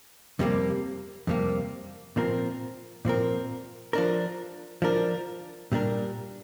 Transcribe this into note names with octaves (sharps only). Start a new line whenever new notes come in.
F2 C3 G3 A#3
F2 C3 G3 A#3
A#2 F3 C4 A#4
A#2 F3 C4 A#4
F3 D4 A#4
F3 D4 A#4
A#2 G3 D4 A#4